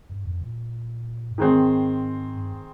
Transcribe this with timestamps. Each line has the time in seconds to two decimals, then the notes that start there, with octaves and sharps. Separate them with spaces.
0.09 G2
0.25 F2
0.41 A#2
1.31 G2
1.38 G#2 D#3 G#3 C4
2.36 G2